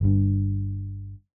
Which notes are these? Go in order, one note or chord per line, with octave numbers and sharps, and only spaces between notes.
G1 G2